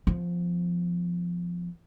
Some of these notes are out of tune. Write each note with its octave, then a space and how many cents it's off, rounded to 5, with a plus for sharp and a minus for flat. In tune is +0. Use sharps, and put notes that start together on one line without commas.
F3 +0 B3 +25